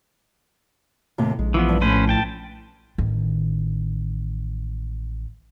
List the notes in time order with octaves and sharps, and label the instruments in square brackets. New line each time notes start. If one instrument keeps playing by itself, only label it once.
[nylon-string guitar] D#2 A2 C3
[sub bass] A#1 [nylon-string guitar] G#3
[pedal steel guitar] E3 F3 B3
[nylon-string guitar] G2
[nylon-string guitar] A2 F3 [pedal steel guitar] C#4 B4 C5
[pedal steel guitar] G5 A5
[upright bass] A1 D#3